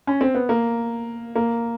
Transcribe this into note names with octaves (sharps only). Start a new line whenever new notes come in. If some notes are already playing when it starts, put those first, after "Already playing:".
C#4
C4
B3
A#3
A#3